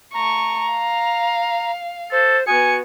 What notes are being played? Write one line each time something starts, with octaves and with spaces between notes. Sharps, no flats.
A3 A#5 C#6
F5
A4 C5
B3 F#4 G#5 C#7